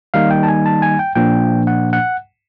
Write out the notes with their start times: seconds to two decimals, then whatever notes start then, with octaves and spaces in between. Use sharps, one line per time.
0.14 D#3 G3 A#3 D#4 F5
0.31 G5
0.43 A5
0.48 G#5
0.66 A5
0.82 G#5
0.99 G5
1.16 A#2 F3 A#3 D4 G5
1.67 F#5
1.93 F#5